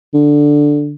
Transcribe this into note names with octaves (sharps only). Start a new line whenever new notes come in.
D3